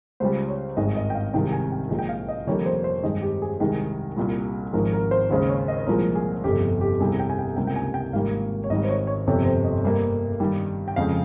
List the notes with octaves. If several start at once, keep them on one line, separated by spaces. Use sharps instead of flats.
C#2 C#3 G3 C5
C#5
G#1 G2 D#3 G#3 D#5
D#5
G5
F5
C2 C3 D#3 G#3 G5
G#5
G5
A#1 A#2 G#3
G5
F5
D#5
F1 F2 D#3 G3 A#3 C#5
C5
C5
G2 D#3 G#3 D#5
G4
G#4
C2 C3 D#3 G#3
C2 A#2 G3
G#1 G#2 F3 G#3 A#4
A#4
C5
D#2 C#3 G#3 C5
C#5
D#5
C2 A#2 F3 G#3 A#4
G#4
G1 F2 C3 G4
G4
G4
C2 C3 G3 G#4
G5
G#5
G5
C#2 C3 G3 A#3 G5
G5
G#5
G5
G#1 G#2 G3 A#3 F5
C#5
G#1 G#2 G3 D#5
C5
C#5
C#5
G1 F2 C3 C#5
C5
D#5
G2 G3 A#3
G2 D#3 G3
G5
F2 C#3 G#3 F5